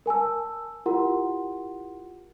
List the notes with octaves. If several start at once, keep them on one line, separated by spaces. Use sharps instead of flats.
A#4 G#5 A5 E6
E4 F4 G4 A#4 F#5 C6